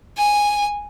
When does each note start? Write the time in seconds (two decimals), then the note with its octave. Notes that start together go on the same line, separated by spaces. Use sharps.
0.17 G#5